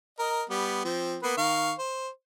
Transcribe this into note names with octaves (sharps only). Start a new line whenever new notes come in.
A#4 D#5
G3 B3
F3 C4
A#3 B3 B4
D#3 F5 C#6
C5